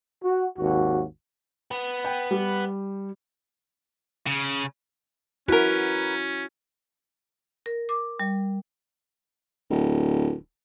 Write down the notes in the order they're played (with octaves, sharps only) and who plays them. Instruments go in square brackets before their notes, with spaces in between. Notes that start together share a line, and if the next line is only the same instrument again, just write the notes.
[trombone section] F#4
G#1 D#2 F#4
[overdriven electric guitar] B3
[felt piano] G5
G3
[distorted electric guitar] C#3
[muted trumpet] C#4 [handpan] E4 F#4 [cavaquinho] A#4 B4
[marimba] A#4
D6
G3
[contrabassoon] D1